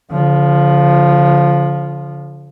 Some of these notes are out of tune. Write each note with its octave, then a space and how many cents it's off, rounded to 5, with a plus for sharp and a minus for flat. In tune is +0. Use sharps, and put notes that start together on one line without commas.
D3 -45 F3 +0